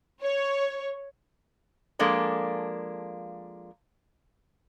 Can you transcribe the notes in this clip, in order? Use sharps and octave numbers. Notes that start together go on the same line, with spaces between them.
C#5
F3 G#3 A#3 D4 A4